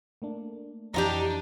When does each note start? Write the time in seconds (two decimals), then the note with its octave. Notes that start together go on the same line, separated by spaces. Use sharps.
0.22 A3 A#3 D4
0.94 F2 E3 D4 D#4 F4 G4 A#5